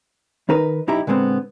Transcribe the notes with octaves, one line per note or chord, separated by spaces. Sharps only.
D#3 D#4 A#4 B4
B1 F#2 D#4 E4 G4 A#5
A#2 D3 G#3 B3 C4